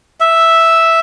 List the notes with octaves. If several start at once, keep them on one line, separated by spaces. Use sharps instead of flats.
E5